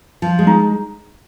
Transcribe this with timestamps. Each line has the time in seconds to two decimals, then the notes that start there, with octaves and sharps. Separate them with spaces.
0.22 F3
0.39 G#3
0.47 D#4